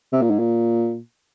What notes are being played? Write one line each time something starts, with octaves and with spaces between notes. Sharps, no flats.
C3
A#2
G#2
A#2